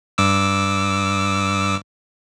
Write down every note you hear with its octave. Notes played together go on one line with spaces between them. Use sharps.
G2 D6 E6